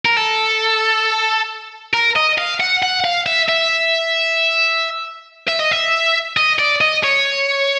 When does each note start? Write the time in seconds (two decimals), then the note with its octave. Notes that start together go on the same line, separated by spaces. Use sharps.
0.05 A#4
0.17 A4
1.94 A#4
2.16 D#5
2.38 F5
2.60 F#5
2.83 F#5
3.04 F5
3.26 E5
3.49 E5
5.48 E5
5.60 D#5
5.72 E5
6.37 D#5
6.59 D5
6.81 D#5
7.04 C#5